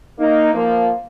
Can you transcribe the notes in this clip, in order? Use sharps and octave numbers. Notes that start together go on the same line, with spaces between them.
A#3 D#4
F3 A#3